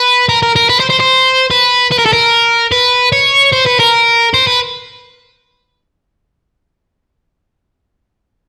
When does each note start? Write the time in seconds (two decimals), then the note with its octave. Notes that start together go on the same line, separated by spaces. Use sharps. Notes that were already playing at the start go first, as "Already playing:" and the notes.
Already playing: B4
0.29 A#4
0.43 A#4
0.56 A#4
0.69 B4
0.80 C5
0.90 C5
1.00 C5
1.51 B4
1.91 B4
1.98 A#4
2.06 A4
2.13 A#4
2.72 B4
3.12 C#5
3.53 C5
3.66 B4
3.80 A#4
4.34 C5
4.47 B4